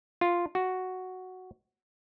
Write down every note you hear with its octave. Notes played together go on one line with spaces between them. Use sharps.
F4
F#4